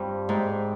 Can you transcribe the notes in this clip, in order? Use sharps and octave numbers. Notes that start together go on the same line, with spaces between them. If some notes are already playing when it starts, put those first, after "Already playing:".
Already playing: G2 G3 C4 F4
G#2 C4